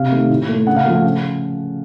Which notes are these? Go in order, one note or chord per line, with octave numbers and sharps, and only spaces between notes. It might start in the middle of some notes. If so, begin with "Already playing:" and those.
Already playing: C3 F5
D#3 A3
A2
A3
C#3 F#5
F5
F3 A3
F5
C#3